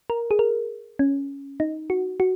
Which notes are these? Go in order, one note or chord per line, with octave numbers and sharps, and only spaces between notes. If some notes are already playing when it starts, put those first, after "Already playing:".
A#4
G#4
A#4
C#4
D#4
F#4
F#4